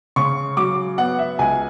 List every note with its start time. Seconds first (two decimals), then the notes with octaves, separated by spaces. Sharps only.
0.16 C#3 C#6
0.57 F#3 D6
0.98 B3 F#5
1.19 E5
1.39 C#2 G#5